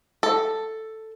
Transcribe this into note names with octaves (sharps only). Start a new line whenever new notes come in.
A4